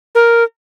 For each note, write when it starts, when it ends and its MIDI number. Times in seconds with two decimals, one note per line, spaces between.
0.15 0.43 70